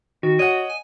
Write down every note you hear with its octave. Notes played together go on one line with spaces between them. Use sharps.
D#3 F#4
C#5 D#5 F#5
G#5